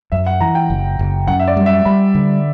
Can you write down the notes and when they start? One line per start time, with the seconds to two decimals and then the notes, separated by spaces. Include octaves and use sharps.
0.12 F#2 E5
0.27 F#5
0.41 E3 A#5
0.55 G5
0.70 F#1
0.99 F#1
1.28 F#2 F#5
1.40 E5
1.48 D5
1.57 G3
1.66 E5
1.85 G3 B5
2.15 D3